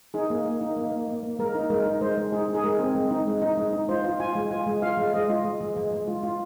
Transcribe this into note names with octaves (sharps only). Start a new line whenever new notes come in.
D#4 G#4
A#3
A#3
D#4
A#3
A#3
A#3
A#3
G#3 A#4
D#4
G#3 A#4
D#4
G#3 C5
G#3
D#4 G#4
D#4
G#4
G#3 A#4
C4
G#3
D#4
G#3
D#4
G#3
D#4
F4 C5
F4
F4 G#5
G#3
F4 G#5
G#3
F4 F5
G#3
G#3 D#5
F4
G#3
G#3
G#3
G#3
F4
F4